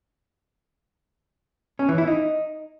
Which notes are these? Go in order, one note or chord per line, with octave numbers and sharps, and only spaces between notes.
C#4
E3
E4
D#4